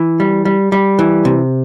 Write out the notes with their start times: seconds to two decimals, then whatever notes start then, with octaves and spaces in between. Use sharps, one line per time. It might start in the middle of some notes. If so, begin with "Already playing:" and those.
Already playing: E3
0.20 G3
0.45 G3
0.72 G3
0.99 E3
1.25 C3